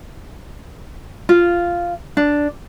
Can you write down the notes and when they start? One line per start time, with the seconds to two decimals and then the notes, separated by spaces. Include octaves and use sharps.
1.29 F4
2.17 D4